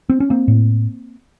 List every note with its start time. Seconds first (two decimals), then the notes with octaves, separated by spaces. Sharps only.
0.09 C4
0.20 C#4
0.30 A#3 C4
0.48 A2